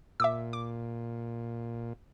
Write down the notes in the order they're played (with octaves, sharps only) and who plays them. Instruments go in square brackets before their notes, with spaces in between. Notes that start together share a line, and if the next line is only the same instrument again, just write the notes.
[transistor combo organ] A#2 [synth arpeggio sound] E5 D6 E6
[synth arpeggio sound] D6